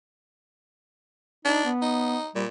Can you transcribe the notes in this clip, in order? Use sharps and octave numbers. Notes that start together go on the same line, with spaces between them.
D4 D#4
B3
D#4
A#2 G3